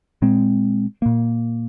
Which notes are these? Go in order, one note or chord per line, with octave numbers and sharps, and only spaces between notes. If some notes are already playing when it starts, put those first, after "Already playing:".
A#2 G#3 C4
A#2 A#3